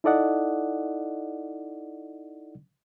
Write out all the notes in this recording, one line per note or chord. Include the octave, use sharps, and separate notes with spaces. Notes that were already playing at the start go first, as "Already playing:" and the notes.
D#4 E4 A4 D5 D#5 F#5